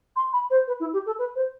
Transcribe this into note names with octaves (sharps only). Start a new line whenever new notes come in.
C6
B5
C5
B4
E4
G4
A4
B4
C5